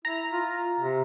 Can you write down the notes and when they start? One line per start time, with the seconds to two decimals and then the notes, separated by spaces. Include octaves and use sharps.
0.05 E4 A#5 A#6
0.32 F4
0.80 C3